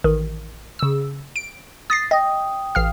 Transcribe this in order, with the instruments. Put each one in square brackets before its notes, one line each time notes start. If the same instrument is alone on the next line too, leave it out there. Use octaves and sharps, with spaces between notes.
[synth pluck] A1 D#3
C#3 E6
D7
[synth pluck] D#6 A#6 C7 [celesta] A6
[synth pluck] D#5 [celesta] G5 D#6
[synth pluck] A1 F5 F6